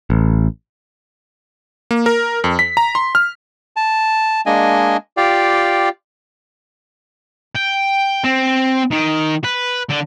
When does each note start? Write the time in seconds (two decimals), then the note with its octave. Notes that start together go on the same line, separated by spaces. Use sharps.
0.10 A1
1.91 A#3
2.06 A#4
2.44 F2
2.59 B6
2.77 A#5
2.95 C6
3.15 F6
3.76 A5
4.46 G#3 A#3 D4 D#5 G#5
5.17 F4 G4 D5 F5 G5
7.56 G5
8.24 C4
8.91 D#3
9.44 B4
9.89 D3